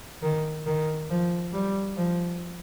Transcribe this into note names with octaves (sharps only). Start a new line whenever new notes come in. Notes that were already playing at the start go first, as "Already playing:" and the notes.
D#3
D#3
F3
G3
F3